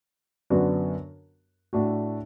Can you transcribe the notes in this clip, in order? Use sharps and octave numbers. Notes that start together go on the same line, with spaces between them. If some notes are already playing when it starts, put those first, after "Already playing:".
F#2 D3 B3 D4 F#4
A2 A3 D4 F#4